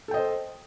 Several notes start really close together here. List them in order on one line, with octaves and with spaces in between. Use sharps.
A4 G5 D#5 C5